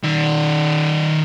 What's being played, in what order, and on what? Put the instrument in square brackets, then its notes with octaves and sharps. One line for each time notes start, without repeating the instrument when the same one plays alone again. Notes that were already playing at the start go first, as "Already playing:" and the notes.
[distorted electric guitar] D#3 D5